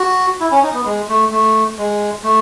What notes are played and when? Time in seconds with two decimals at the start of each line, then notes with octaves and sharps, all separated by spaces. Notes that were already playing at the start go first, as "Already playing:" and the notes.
Already playing: F#4
0.40 E4
0.52 C#4
0.63 D#4
0.74 B3
0.86 G#3
1.09 A3
1.32 A3
1.78 G#3
2.23 A3